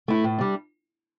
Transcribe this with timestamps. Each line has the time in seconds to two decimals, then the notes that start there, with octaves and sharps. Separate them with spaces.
0.08 A3 E4
0.24 A2
0.38 G3 D4